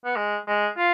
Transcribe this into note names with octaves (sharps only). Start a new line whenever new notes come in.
B3
G#3
G#3
F4